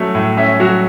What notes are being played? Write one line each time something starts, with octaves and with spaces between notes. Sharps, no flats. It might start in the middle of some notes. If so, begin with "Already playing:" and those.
Already playing: F#3 A3 C#4
A2
C#4 E5
F#3 F#4